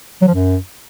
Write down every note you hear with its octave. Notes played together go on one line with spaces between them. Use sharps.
F#3
F3
F#2